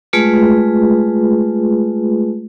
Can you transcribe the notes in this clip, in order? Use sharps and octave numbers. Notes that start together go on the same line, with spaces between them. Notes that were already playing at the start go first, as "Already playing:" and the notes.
G#3 A3 F4 G#4 B4